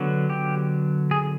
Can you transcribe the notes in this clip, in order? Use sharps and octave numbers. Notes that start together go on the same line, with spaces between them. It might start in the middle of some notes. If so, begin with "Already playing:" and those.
Already playing: D3 F#3 B3
G4
G#4